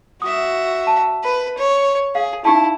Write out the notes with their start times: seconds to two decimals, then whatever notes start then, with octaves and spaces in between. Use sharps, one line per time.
0.22 F#4 E5 D#6
0.87 A5
1.23 B4 B5
1.57 C#5
2.15 G#4 F5
2.45 D#4 E4 G4 A5